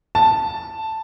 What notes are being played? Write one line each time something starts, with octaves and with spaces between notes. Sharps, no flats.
A5